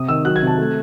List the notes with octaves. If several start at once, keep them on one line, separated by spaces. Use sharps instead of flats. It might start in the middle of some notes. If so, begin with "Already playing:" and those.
Already playing: C3 D#6
D#3 E6
F#3 F#6
G#6
C3 A5
A3